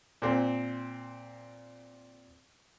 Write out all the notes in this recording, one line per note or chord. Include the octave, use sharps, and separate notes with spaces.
A#2 C4